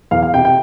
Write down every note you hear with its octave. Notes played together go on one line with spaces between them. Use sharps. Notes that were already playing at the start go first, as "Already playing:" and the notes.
E2 F5
F5
C3 G5
G5